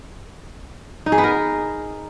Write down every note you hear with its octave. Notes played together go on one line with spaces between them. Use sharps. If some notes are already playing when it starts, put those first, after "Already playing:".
D#4
G#4
B3
A#4